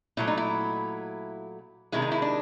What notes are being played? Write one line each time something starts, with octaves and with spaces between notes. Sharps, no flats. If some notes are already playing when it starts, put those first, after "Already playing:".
A#2 F#3 A3 E4
D#4
E4
C3 D#3 G#3 E4
D#4
E4
D4